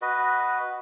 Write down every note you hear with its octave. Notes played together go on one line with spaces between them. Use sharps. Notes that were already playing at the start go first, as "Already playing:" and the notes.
F#4 B4 D#5